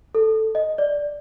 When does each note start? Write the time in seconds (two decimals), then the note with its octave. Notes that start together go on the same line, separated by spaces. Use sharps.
0.15 A4
0.55 D#5
0.78 D5